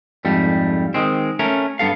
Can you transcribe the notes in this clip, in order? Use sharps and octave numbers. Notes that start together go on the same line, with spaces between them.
F2 G#2 G3 A3
D#3 G#3 C4
A3 C#4 A#4
G2 B3 A4 F5